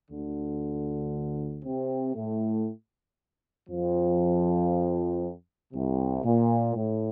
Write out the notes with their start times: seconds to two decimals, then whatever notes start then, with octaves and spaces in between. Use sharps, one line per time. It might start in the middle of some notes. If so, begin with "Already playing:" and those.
0.10 D2 D3
1.64 C3 C4
2.15 A2 A3
3.69 F2 F3
5.73 C2 C3
6.24 A#2
6.75 A2